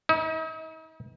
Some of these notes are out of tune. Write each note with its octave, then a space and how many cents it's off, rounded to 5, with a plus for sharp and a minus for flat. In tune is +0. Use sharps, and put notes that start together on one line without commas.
D#4 +45